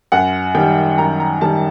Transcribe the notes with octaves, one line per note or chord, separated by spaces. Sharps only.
F#2 F#5
D#3 G3 G5
F#2 A#5
A#5
D#3 G3 A5